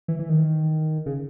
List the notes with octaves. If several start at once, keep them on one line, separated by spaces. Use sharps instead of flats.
E3
E3
D#3
C#3